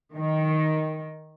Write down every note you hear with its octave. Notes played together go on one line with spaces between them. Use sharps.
D#3